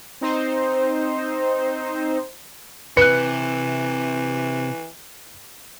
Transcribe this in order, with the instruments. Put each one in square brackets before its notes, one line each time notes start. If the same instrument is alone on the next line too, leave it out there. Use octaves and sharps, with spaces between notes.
[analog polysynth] C4 D#4 C5
[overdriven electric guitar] C3 [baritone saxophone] E3 [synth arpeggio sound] B4 [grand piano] F#6 C#7